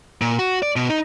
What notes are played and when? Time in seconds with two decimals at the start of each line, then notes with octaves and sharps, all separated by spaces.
0.21 A#2
0.39 F#4
0.62 D5
0.76 B2
0.89 D#4